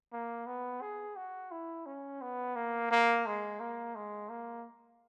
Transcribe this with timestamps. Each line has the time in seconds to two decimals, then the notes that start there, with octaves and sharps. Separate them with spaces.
0.13 A#3
0.46 B3
0.82 G#4
1.16 F#4
1.52 E4
1.86 C#4
2.22 B3
2.56 A#3
2.91 A#3
3.26 G#3
3.60 A#3
3.96 G#3
4.29 A#3